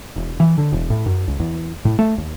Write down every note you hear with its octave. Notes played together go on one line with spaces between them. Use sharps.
E1
E3
D3
E1
A2
F#2
C#2
E2
A2
A3
D#2